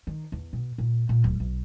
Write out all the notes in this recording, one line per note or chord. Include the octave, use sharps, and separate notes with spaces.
D#3
E2
B2
A#2
A#2
D1
B1